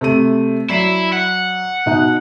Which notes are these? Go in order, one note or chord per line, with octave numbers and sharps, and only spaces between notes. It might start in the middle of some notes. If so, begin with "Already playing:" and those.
C3 A3 D#7
F#3 E4 D5 E5 C7
F#5
B2 D#4 F#6